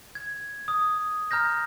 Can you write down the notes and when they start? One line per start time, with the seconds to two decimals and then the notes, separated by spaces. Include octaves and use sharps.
0.15 G#6
0.68 D#6
1.31 A#5 F6 G6 A#6